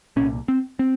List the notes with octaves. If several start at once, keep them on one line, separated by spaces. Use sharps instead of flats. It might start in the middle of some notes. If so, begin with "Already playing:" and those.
C2 A#2 C#4
C4
C4